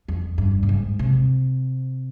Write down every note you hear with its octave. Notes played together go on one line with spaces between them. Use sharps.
F2
G2
A#2
G#2
C3